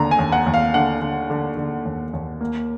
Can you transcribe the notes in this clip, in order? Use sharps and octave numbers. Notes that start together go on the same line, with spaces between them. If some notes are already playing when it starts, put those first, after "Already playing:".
Already playing: D#2 D3 A#5
G#5
D#2
F#5
D#2
F5
D3 F#5
D3
D3
D3
D#2
D#2
A#3